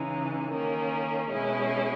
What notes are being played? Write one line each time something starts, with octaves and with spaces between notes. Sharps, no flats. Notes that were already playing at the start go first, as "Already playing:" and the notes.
Already playing: C#3 E3 G#3 D#4
D#3 A#3 C#4
B2 G#3 C#4 E4